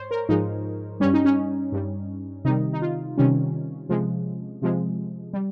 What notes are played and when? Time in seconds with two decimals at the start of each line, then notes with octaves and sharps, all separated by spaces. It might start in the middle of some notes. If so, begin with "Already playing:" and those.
Already playing: G#2 C5 C#5
0.11 A#4
0.29 G#2 F3 G#3 D#4
1.00 G2 G3 C#4
1.14 D#4
1.25 C#4
1.72 G2 G3
2.45 C3 D#3 G3 D#4
2.73 D#4
2.82 F4
3.18 C3 D#3 G3 C#4
3.89 C3 F3 G#3
4.62 C3 F3 G#3
5.33 G3